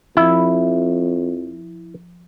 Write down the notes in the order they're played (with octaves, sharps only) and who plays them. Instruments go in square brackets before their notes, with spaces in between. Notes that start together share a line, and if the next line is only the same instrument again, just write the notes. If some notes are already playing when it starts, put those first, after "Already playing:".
[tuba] F2 [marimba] F3 [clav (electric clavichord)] E4